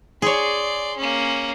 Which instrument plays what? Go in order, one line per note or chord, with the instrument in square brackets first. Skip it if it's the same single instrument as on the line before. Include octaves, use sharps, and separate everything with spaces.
[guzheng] G#4 C#5 [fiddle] D5 C6
[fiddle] A#3 C#4